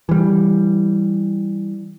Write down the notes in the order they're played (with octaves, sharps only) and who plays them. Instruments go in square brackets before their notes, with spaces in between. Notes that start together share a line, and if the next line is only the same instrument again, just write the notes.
[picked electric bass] E3 G3